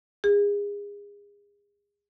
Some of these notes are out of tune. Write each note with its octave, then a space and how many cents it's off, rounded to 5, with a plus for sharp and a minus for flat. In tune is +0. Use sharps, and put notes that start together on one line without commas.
G#4 -30